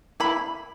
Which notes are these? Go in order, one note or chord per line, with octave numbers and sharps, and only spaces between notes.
E4 B5